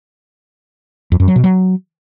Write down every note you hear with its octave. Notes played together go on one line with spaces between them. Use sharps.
F2
F#2
F#3
B2
F#3